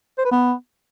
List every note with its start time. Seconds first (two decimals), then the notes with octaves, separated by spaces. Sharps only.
0.18 C5
0.25 B4
0.31 B3